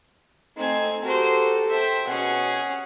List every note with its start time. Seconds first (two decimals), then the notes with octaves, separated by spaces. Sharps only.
0.57 A3 C4 D#4 G#5
1.03 F#4 G4 A4 A#4 C5
1.70 C5 E5 G5
2.08 B2 C#4 G#4 F#5 G#5